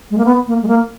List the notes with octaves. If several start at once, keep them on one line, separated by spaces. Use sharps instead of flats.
G#3
A#3
B3
A#3
G#3
A#3